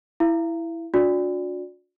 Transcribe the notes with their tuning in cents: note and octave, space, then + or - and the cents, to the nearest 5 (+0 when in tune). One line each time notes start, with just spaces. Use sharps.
E4 +0 F5 -45
D4 -20 F#4 -40 D5 -5